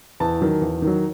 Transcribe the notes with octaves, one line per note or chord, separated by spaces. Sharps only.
E2 A5
D#3 F#3
E2
D#3 F#3